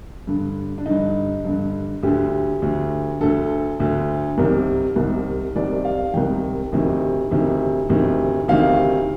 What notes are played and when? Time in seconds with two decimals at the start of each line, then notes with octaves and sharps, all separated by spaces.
0.27 G2 D3
0.78 D4
0.86 G2 D3 D#4
1.45 G2 D3
2.03 D2 D3 G4
2.62 D2 D3
3.20 D2 D3 A4
3.80 D2 D3
4.38 C2 C3 D#3 A#4
4.96 C2 C3 D#3
5.55 C2 C3 D#3 D5
5.85 F5
6.13 C2 C3 D#3 G5
6.72 D2 C3 D#3
7.31 D2 C3 D#3
7.90 D2 C3 D#3
8.48 D2 C3 D#3 F5